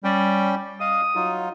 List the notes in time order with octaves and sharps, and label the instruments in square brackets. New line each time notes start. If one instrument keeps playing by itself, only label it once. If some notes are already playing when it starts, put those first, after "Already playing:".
[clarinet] G3 [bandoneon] C#4 D5 G5
[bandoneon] D#5 F5 [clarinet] D#6
[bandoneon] F#3 D#4 F4